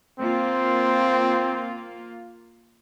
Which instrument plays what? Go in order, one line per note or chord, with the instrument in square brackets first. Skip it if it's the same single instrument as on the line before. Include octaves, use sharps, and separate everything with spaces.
[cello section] A#3 F4 [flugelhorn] C4